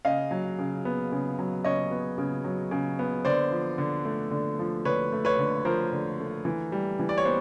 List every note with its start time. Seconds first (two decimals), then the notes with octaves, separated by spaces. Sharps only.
0.05 C#3 D#5 F5
0.31 F#3
0.59 C#3
0.85 B3
1.12 C#3
1.39 F#3
1.64 C#3 C#5 D#5
1.91 B3
2.18 C#3
2.44 F#3
2.71 C#3
2.99 B3
3.25 D3 C5 D5
3.51 F3
3.78 D3
4.05 A3
4.31 D3
4.59 F3
4.85 D3 B4 C#5
5.12 A3
5.25 B4 C#5
5.39 D3
5.65 F3 A#4 C5
5.92 D3
6.19 A3
6.45 E3
6.72 G3
6.99 E3
7.09 D5
7.18 C#5
7.25 B3 C5